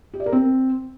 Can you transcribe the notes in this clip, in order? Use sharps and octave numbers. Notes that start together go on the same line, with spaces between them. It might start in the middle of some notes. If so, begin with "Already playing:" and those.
G4
D5
A#4
C4